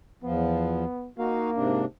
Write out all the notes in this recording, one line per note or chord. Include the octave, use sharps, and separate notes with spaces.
E2 F3 B3
A#3 D#4 F#4 F5
G#2 C3 D4